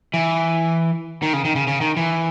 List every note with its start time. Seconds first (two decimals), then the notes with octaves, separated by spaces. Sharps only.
0.14 E3
1.22 D#3
1.33 C#3
1.45 D#3
1.56 C#3
1.67 C#3
1.81 D#3
1.97 E3